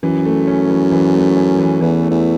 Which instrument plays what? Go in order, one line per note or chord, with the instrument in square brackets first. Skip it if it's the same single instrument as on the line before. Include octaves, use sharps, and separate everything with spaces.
[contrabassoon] F#2 [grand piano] E3
[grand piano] A3
C#4
E3
E3
A3
C#4
E3
[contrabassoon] E2 [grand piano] E3
[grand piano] A3
[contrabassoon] E2